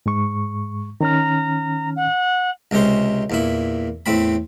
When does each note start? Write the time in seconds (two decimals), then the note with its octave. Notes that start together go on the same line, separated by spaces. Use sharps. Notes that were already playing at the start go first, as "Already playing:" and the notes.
0.06 G#2 G#3 C#6
1.01 D#3 C#4 A#5 F6
1.96 F#5
2.71 C#2 C3 G#3 C#4 C5
3.30 E2 A#2 E4
4.06 E2 A2 C4 B5